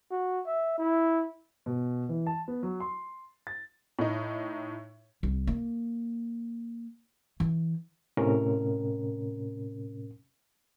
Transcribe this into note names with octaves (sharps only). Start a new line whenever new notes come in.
F#4
E5
E4
B2
E3
A5
B3
F#3
C6
A6
A2 D#4
C2
A#3
E3
A2 C3 C#4 A#4